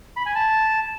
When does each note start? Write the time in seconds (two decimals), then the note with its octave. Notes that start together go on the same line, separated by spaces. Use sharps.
0.17 B5
0.26 G#5
0.35 A5